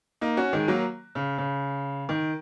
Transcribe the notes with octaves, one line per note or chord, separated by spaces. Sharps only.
A#3 D#4
C#4 F#4
D#3 G#3
F#3 A#3
C#3
C#3
D#3